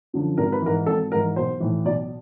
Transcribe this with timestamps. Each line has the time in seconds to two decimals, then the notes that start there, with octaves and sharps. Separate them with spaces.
0.13 F#2 D3 F3
0.38 G#1 A#4
0.52 B4
0.62 G#2 E3 A#4
0.86 G#1 A4
1.12 G#2 E3 A#4
1.36 B1 C5
1.60 A2 E3
1.85 B1 D5